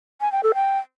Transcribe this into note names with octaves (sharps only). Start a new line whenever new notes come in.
G#5
G5
A4
G5